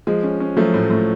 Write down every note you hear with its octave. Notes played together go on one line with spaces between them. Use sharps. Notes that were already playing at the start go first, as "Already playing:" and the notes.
F3 G#3
C#4
C#4
F3 F#3 A3
A2
A2